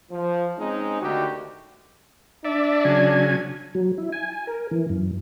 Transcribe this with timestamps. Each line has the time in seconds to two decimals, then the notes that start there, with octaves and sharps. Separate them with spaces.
0.11 F3
0.58 G#3 C4 C#4 D#4
1.01 D2 D3 D#3 F#4 G4
2.45 D4 D5 E5
2.85 C#3 F#3 G#5
3.75 F#3
3.98 E4
4.12 G#5
4.33 G#5
4.47 A#4
4.71 E3
4.89 F#2